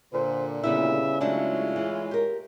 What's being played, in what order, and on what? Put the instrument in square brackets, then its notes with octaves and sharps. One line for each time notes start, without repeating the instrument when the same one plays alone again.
[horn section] A#2 D3 [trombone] C5
[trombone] C#3 [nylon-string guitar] G3 B3 E4 [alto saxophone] E5
[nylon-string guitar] F#3 A3 D4 [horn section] G#3 F4 C#5 [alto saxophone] E4
[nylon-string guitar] E3
G4 A#4